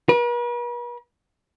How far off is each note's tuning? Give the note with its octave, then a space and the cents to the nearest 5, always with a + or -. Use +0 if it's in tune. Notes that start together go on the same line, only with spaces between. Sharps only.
B4 -45